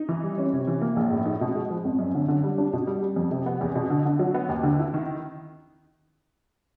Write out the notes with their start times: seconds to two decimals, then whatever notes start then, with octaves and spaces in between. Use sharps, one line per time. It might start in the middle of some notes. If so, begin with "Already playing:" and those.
Already playing: D#4
0.09 E3
0.23 G3
0.38 C#4
0.53 C3
0.67 E3
0.81 A#3
0.97 A#1
1.12 A2
1.25 D#4
1.41 B2
1.56 G#3
1.70 F3
1.84 G#1
1.99 F#2
2.15 D3
2.28 D3
2.43 G3
2.58 D4
2.73 B2
2.87 G3
3.03 G3
3.16 F2
3.31 C3
3.46 B3
3.61 E2
3.76 B2
3.90 D3
4.05 D3
4.19 F#3
4.34 B3
4.49 D#2
4.63 D3
4.79 E4
4.94 D#3